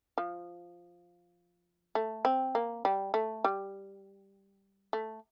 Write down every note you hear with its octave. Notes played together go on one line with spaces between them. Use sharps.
F3
A3
C4
A#3
G3
A3
G3
A3